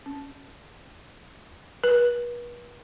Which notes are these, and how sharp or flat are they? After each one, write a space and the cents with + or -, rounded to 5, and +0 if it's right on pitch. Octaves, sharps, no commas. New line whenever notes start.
C#4 -5
B4 -40